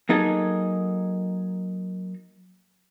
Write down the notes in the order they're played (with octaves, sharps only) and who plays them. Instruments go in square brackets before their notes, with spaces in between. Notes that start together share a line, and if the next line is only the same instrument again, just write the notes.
[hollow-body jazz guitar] F#3 A#3 D#4 G#4 A4